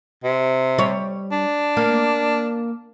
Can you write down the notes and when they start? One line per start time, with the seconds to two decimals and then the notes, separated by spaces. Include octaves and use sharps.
0.24 C3
0.78 G3 C#5
1.32 D4
1.77 A#3